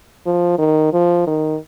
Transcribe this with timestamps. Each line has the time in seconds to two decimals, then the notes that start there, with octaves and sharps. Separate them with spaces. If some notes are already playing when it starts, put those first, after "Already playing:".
0.26 F3
0.58 D#3
0.92 F3
1.27 D#3